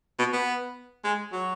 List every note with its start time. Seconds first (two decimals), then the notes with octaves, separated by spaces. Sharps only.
0.19 B2
0.33 B3
1.04 G#3
1.32 F#3